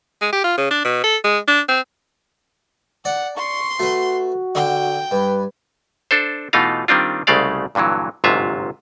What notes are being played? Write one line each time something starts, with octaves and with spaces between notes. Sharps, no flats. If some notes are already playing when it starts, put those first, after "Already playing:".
G#3
G4
F4
C#3
D4
B2
A4
G#3
D4
C4
D5 F#5
C6 C#6
A3 F#4 B4
D3 G5
G2 B4
D4 A4 C5
B2 E3 A3 D#4 F4 F5
D#3 G3 C4 D4 F4
C2 C#3 G#3 A3 D5 F5
G2 A#2 D3 E3 F#3
G1 G#2 C3 F#3 F4 E5